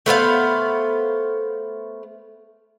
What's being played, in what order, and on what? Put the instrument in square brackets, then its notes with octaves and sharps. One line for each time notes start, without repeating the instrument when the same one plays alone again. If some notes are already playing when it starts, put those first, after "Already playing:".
[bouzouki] A3 B3 C5 F5